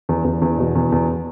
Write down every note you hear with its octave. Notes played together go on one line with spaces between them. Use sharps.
E2
E2
E2
B2
E2
E2